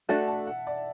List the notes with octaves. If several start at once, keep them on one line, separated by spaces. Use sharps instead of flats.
A3 D4 F#4 A4 E5
A5
F#5
D5